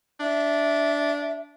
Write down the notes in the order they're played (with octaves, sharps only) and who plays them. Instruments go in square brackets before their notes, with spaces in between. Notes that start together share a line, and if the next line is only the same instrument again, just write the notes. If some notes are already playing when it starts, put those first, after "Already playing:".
[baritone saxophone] D4 [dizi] E5